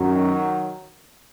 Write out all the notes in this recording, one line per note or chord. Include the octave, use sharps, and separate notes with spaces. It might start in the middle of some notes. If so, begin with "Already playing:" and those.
Already playing: F#2 D#3 F#3